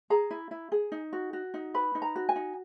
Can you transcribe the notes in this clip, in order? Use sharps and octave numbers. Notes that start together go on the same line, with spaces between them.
G#4 A#5
E4
E4
G#4
D#4
F#4
F#4
D#4
B4 B5
D#4
A#5
F#4
G#5
D#4